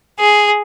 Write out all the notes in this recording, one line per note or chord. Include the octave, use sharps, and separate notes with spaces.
G#4